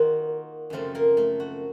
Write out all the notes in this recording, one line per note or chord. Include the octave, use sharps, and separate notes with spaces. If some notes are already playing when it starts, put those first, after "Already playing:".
Already playing: D#3 A#3 F4 F#4
F#2 C#3 F3 A3 C4 F4 A4
A#3 A#4
A3 A4
F#4